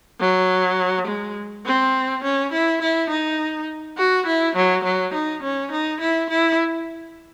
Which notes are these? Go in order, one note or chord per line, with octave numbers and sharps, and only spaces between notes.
F#3
G#3
C4
C#4
E4
E4
D#4
F#4
E4
F#3
F#3
D#4
C#4
D#4
E4
E4